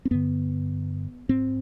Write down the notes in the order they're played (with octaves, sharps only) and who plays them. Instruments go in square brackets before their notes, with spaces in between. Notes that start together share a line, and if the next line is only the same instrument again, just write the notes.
[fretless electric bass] C4
G2 D3 B3
G#2 C4